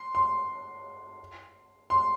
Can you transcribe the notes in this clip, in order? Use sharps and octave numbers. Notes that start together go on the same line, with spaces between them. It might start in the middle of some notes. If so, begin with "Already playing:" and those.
Already playing: C6
C6
C6